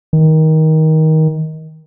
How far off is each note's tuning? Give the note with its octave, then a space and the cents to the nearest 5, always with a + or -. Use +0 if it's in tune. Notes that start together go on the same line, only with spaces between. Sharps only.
D#3 +20